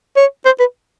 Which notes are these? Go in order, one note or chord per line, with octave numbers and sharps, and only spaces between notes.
C#5
C5
B4